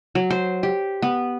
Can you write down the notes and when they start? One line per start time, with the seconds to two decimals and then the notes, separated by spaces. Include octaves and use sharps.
0.15 F#3
0.30 C5
0.63 G4
1.02 B3